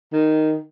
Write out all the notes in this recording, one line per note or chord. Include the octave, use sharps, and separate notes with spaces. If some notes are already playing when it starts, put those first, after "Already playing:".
D#3